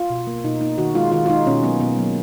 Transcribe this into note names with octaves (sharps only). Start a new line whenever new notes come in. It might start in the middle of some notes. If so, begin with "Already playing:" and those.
Already playing: F4
B2
A#3
B2 D#4
A#3 D#4
D#3 F#4
G#3 F4
D#3 F4
F4
G#3 D#4
B2 C#4
F#3 A#3 B3
B2 B3
F#3 A#3